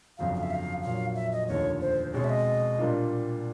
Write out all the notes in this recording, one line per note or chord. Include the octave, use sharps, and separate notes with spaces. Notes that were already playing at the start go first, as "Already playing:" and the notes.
G1 F2 C#3 F#3 F5
F5
E5
F5
A#1 A#2 F#3 F5
E5
D#5
F1 D#2 D3 F3 C#5
C5
B2 G#3 C4 C#5
E5
D#5
A#2 G3 A#3 D4 F4